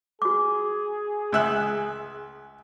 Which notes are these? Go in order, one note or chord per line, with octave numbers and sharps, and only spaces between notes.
F#4 G#4 D6
C#2 E5 F#6